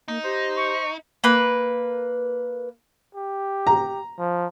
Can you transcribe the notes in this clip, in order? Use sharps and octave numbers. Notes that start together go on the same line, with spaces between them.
A#3 D#4
G4 C5
C#6
A#3 B4
G4
A#5
F3